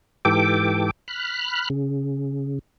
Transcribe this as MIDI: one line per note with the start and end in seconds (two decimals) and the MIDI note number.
0.25 0.91 44
0.25 0.91 52
0.25 0.91 67
0.25 0.91 69
0.25 0.91 79
0.25 0.91 86
1.08 1.69 83
1.08 1.69 89
1.08 1.69 90
1.70 2.59 49